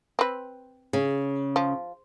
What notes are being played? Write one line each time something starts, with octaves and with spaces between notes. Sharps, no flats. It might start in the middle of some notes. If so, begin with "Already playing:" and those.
C4 B4
C#3
F3